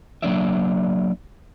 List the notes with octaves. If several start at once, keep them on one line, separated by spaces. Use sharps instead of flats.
F#3 A#3 D4 C#5 D5 E5